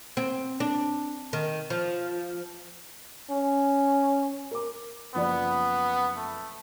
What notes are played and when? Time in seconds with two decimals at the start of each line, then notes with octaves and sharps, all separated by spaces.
0.17 C4
0.60 D4
1.33 D#3
1.70 F3
3.31 C#4
4.51 A#4 D6
5.15 F#1 F3 B3 D5
6.17 A3